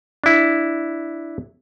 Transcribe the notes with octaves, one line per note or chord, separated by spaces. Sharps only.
D4 E4